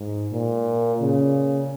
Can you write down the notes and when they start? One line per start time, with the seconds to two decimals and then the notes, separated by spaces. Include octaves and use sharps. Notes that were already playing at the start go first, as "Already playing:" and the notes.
Already playing: G#2
0.31 A#2
1.01 C#3